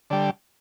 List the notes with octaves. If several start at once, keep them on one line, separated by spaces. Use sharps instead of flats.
D3 G3